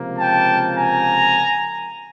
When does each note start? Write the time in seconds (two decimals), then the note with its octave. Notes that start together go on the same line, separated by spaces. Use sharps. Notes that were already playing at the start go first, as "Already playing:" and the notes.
Already playing: C#2 C3 F3 A#3
0.18 G5 A5
0.76 G#5 A#5